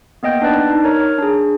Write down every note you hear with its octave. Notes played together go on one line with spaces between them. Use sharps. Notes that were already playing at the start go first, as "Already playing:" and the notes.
A#3 B3 D#5 G5 G6
D4 D#4 B4 D5 A5
D#4
A#4 C#5 A#5
D4 G#4